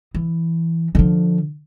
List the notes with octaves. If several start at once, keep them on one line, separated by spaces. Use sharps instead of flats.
E3
D3 F3